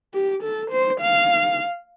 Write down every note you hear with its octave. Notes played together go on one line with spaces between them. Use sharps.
G4
A4
C5
F5